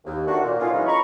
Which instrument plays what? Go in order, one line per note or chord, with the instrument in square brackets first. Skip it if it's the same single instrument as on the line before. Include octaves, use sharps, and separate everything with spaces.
[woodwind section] D#2
D#3 A3 D4 F#4
A#2
B2 D3 C#4 D#4 F4
E3 F#3 G#3 C#4 D#4 F4
A#5 B5 C#6